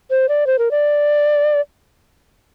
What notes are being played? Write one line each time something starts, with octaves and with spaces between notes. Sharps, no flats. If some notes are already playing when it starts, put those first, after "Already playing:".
C5
D5
C5
A#4
D5